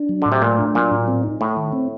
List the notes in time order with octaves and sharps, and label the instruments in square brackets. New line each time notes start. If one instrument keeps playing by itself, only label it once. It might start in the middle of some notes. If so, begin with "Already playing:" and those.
Already playing: [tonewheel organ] D4
F#3
[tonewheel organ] A2 [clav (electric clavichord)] D3
[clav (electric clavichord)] C3
[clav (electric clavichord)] A#2 [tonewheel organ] A3
[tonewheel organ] D4
[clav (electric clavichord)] A#2 [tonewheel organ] F#3
[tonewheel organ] A2
C4
D#4
[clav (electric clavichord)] A2 [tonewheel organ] A3
[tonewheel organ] D#3
C4